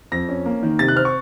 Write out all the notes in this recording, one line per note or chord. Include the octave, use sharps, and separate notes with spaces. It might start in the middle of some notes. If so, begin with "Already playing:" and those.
F2 A#6
C#4
A#3
D#3
C3 A6
F#6
C4 F6
C#6